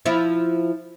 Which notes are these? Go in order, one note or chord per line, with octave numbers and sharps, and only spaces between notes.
F3 E4